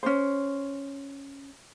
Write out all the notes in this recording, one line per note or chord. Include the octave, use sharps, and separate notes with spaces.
C#4 D4 C5